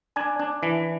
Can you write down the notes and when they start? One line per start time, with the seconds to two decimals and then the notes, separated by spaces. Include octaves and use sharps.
0.16 D4 G#5
0.40 D4
0.63 E3